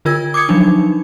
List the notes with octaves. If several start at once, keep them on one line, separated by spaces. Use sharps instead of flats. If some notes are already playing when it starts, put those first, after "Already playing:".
D3 F4 A#4 E6 G#6
D6 D#6 G#6 C#7
F3 F#3 D4 D#4